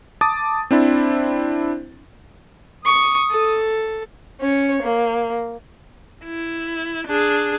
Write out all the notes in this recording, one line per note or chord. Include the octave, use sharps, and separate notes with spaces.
A5 D6 D#6 A6
C4 D4 E4 C5
C#6 D#6
A4
C#4 C#5
A#3
E4
D4 G#4